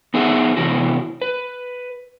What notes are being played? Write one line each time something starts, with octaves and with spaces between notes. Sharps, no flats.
B3 D#4 G#4 A4 E5 F#5
C3 E3 B3 E4 F#4
B4